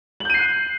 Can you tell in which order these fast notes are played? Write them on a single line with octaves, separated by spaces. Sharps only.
F#7 G6 D#7 C7 F#6